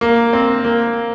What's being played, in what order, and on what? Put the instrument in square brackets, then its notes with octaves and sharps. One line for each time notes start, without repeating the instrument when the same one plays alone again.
[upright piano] A#3
C4
A#3